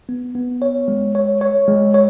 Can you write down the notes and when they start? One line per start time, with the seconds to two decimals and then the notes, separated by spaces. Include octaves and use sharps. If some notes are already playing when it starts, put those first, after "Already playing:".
0.09 B3
0.35 B3
0.62 C#5
0.88 G#3
1.15 C#5
1.41 C#5
1.68 G#3
1.94 C#5